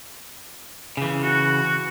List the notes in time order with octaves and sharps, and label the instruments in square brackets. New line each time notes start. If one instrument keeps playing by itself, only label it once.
[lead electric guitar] C#3 E3
[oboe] F#4